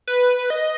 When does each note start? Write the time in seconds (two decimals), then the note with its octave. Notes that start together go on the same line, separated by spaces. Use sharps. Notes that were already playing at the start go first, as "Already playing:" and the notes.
0.07 B4
0.50 D#5